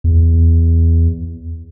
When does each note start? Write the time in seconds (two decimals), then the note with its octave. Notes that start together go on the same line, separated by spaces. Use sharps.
0.04 E2